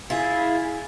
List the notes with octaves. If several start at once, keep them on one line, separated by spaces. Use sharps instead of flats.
E4 F4 G#4